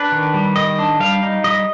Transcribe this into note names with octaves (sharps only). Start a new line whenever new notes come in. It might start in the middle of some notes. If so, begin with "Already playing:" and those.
Already playing: D4 B4
D#3
G3
D#3 D#5
D4
G3 F5
D#4
G3 D#5